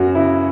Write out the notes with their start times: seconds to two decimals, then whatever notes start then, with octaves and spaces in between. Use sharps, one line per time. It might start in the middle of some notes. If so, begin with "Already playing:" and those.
Already playing: F#2 C#4 F#4
0.15 C#3 E4